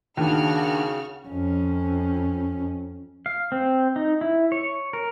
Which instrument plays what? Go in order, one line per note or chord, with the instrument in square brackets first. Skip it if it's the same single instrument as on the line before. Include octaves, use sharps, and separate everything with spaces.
[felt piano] D#2 [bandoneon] C#3 [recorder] D4 [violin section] F#4 F6
[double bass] F2 C#4
[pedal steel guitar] F5
C4
D#4
E4
C#5
A#4